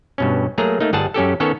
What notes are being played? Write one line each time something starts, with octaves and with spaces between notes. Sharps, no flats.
G2 B2 C#4
F#3 A3 A#3 G#4 A#5
A3 A#3 D#4
G1 G3 G#4 F#5 A5
F#2 C#4 G4 A4
D#3 B3 C#4 A4 C#5